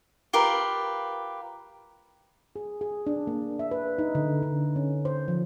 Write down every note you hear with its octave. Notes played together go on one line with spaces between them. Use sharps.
F4 G4 A#4 B4
G#4
G#4
D4
A#3
E5
B4
D#4
D3
D3
C#4
C5
F3